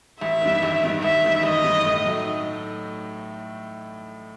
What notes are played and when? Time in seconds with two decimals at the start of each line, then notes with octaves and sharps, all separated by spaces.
0.21 A1 E5
0.41 G2 D#3
0.63 A1
0.83 G2 D#3
1.02 A1 E5
1.23 G2 D#3
1.43 A1 D#5
1.64 G2 D#3
1.85 A2
2.05 F#3 A3 D#4